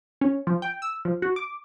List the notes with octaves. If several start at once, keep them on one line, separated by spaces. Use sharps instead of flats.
C#4
F3
G5
E6
F3
F#4
D6